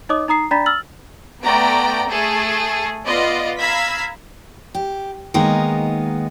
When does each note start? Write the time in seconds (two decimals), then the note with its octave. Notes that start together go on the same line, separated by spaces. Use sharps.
0.09 D#4 C#5 D#5 D6 D#6
0.28 D#4 A#5 D#6 C7
0.51 D4 D5 A#5 B5 A6 B6
0.66 E6 F6 A6 F#7
1.43 A3 B3 D5 G5 A#5 D7
2.09 A3 G#4 A4
3.05 B3 F4 D5 D#5
3.59 F5 A#5 B5 E6 G#6 B6
4.75 G4
5.34 D#3 G#3 A#3 B3 D#4 A#4